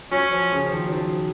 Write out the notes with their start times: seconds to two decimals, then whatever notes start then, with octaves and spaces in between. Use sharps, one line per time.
0.12 F#3 C#4
0.31 F3
0.52 C#3
0.66 F3
0.72 D#3
0.86 F#3
0.92 F3